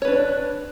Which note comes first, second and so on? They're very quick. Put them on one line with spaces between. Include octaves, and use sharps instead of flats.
C#5 B4 D4